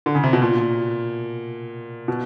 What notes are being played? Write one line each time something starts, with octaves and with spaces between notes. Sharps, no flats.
D3
C#3
C3
B2
A#2
B2